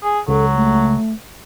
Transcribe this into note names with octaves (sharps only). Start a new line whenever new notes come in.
G#4
C#2 F#3 A4
A3